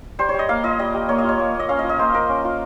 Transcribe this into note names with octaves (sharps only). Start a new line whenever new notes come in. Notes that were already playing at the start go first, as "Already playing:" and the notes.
G3 C5
C#5
G3
D#5
A#3 F5
F4 D#5
G3 D#5
G3
A#3 C#5
D#5
F4 C#5
A#3
A#3
D#5
C#4 F5
D#5
F4
D#5
A#3 C5
A#3 A#4
C#4
F4